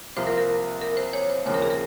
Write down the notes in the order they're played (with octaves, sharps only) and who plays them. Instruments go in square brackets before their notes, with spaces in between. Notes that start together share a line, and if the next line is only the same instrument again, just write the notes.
[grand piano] C2 C3 F3 A#3 F4 [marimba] C5
[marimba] A#4
A#4
A#4
C5
C#5
C5
[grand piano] D#2 C#3 F3 A#3 [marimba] C#5
[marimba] A#4
G#4
A#4